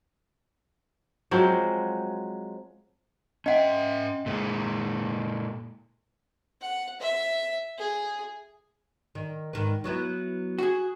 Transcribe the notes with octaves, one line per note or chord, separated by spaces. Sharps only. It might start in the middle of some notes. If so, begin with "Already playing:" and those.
F3 F#3 G#3 C4
C#4 D#5 E5 F#5 G5
A#2 G#3
F#5
E5
G#4
D#3
G#2 D#3 B4
F#3 B3 E4
F#4 G#4